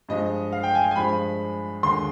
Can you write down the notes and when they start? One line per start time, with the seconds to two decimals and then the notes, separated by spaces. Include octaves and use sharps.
0.09 G2 F3 G#3 D#5
0.52 F5
0.63 G5
0.75 G#5
0.91 G#5
0.96 G2 F3 G#3 B5
1.83 D#2 D3 G#3 C6